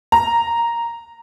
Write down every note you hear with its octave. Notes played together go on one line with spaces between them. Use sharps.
A#5